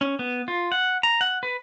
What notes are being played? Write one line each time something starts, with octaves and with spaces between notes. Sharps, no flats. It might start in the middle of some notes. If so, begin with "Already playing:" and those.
C#4
B3
F4
F#5
A#5
F#5
B4